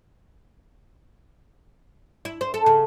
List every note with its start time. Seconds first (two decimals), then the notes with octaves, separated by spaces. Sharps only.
2.25 E4
2.41 C5
2.54 A4
2.66 C#3